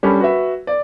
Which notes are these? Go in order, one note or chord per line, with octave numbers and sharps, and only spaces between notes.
G3 C#4 D4 A4 B5
F#4 B4 E5
D5